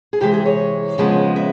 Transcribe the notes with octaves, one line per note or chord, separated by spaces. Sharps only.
G#4
C3 E3 G#3 G4
G#4
C#5
F2 C#3 F3 G#3 B3
E5